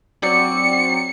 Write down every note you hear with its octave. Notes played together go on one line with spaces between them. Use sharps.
F#3 C4 D5 C#7